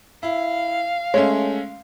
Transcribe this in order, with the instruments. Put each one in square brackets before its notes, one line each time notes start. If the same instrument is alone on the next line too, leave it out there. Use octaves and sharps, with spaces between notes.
[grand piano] E4 [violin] F5
[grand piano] G#3 A3 C#4 [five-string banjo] C#5